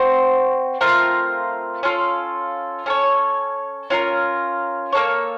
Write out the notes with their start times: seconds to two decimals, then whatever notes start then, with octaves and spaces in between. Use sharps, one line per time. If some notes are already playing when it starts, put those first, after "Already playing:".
Already playing: C4 F#4 C5
0.81 A3 C4 F4 A#4
1.83 C#4 F4 A4
2.86 C#4 A4 C#5
3.90 C#4 F4 A#4
4.93 A#3 D#4 A4 C#5